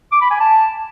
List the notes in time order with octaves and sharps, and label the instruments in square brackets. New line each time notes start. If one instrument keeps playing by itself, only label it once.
[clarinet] D6
B5
G#5
A5